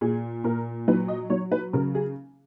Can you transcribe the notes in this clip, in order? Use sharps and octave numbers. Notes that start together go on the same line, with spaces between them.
A#2 G#4
A#2 A#4
F#3 B4
D#5
F#3 C#5
B4
C#3 A#4
G#4